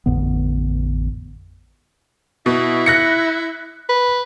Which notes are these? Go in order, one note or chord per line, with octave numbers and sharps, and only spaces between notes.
A1 F2 D3 B3
B2 E4
F#6 A#6 C#7
B4